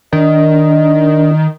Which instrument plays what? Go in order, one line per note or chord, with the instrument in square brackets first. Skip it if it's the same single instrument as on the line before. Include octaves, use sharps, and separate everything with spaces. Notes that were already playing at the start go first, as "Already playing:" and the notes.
[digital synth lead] D#3 [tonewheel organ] D4 [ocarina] D#5